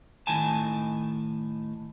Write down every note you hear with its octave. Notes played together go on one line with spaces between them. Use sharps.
A2 D#3 G#5 A5